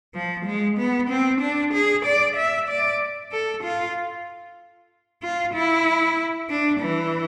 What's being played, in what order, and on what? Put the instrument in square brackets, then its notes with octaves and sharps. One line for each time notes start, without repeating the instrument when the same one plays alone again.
[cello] F3
G#3
B3
C4
D4
G#4
D5
E5
D5
A4
F4
F4
E4
D4
E3